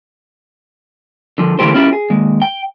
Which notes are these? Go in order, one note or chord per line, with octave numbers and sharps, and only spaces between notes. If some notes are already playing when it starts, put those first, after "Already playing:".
D3 F3
D3 E3 A3 G4 C5
C#4 E4 F4 G4
G#4
D#2 G#3
G5